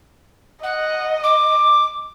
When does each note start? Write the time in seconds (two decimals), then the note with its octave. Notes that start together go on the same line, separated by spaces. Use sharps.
0.63 D#5 F#5
1.24 D6